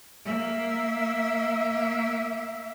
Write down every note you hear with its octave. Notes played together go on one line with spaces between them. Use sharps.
A#3 E5